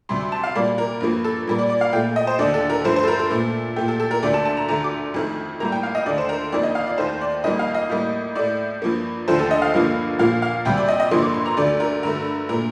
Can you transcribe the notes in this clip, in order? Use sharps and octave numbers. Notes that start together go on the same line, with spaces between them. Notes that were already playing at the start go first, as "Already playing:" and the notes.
D2 C3 G3 C6
C6
A5
F5
A#2 G3 A#3 D5
A#4
G2 F3 A#3
A4
A#2 G3 A#3
D5
D5
F5
A#2 A3 G5
D#5
C5
D#2 D3 A3 D5
A4
A#4
G2 F3 A3 C5
C5
A4
A#4
A4
A#2 A3
A#2 A3 G4
A4
A4
A#4
D2 D3 A3 D5
A5
A5
A#5
D2 D3 A3 A#5
D6
F2 D#3 A3
A2 G3 A#3 A#5
G5
F5
D#5
D#2 D3 A3 D5
C5
A#4
F2 D#3 A#3 D5
D#5
F5
D5
D#2 D#3 A3 C5
D5
F2 D#3 G3 A#3 D#5
F5
D#5
A2 G3 A#3
A2 A3 D5
G2 F3 A#3
D#2 D3 F3 A3 C5
A4
D#5
F5
G2 D3 F3 A#3
A#2 F3 A#3 F5
F5
D2 C3 G3 G5
D5
D#5
D#5
G2 D3 F3 A#3 C6
D6
C6
A#5
D2 D3 A3 D5
A#4
G2 D3 A3 A#4
A#2 A3 A#4